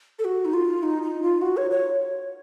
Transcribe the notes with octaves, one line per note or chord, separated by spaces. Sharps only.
A4
F#4
D#4
F4
D#4
D#4
F4
F#4
C#5
C#5